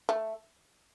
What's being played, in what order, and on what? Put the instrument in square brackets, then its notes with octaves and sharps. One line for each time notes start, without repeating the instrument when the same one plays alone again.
[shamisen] A3